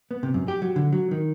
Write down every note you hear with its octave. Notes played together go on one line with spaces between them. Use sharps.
B3
C3
F#2
G4
F#3
D3
F#3
D#3